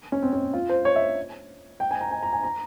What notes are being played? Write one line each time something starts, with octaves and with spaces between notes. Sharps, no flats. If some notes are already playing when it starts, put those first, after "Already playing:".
C#4
C4
C#4
F4
C5
C#5
E5
G5
G#5
A#5
G#5
A#5
G#5
A#5